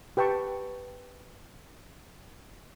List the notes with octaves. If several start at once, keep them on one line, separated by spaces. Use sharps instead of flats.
G4 B4 G5 A5 C#6